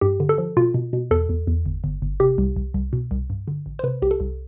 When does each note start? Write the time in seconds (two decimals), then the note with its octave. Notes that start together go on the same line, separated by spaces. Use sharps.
0.01 G2 G4
0.20 D3
0.29 A4
0.38 F3
0.57 B2 F4
0.74 B2
0.93 B2
1.11 E2 A4
1.29 E2
1.47 E2
1.66 G1
1.84 G1
2.02 G1
2.20 C3 G4
2.38 C2
2.56 C2
2.74 C2
2.93 B2
3.11 C2
3.30 G2
3.47 D3
3.66 A1
3.79 C5
3.84 C3 B4
4.02 C2 G4
4.11 A4
4.20 C2